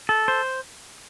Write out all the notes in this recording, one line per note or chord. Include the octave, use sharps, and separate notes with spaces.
A4
C5